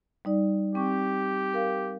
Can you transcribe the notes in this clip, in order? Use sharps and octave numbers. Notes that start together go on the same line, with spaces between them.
G3 D#4 D5
C4 G4 C#6
A#4 F5